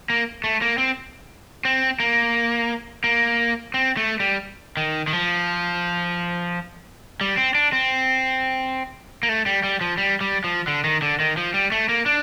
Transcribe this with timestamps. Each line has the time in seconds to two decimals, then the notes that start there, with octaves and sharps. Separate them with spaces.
0.10 A#3
0.44 A3
0.62 A#3
0.78 C4
1.65 C4
2.00 A#3
3.04 A#3
3.74 C4
3.97 A3
4.20 G3
4.77 D#3
5.07 D#3
5.13 F3
7.21 G3
7.37 C4
7.55 D4
7.73 C4
9.23 A#3
9.29 A3
9.46 G3
9.64 G3
9.81 F3
9.98 G3
10.21 G3
10.44 F3
10.68 D3
10.84 D#3
11.02 D3
11.20 D#3
11.37 F3
11.54 G3
11.72 A3
11.89 A#3
12.06 D4